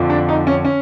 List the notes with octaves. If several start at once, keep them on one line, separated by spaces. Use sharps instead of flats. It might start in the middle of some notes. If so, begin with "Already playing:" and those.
Already playing: F2 D3 F3
D4
D#4
C#4
C#4